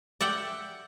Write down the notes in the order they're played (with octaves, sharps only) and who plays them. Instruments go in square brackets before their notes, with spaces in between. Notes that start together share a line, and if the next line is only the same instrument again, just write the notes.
[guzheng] D5 E5 F#5 G5